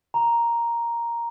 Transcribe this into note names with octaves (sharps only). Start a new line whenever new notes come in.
A#5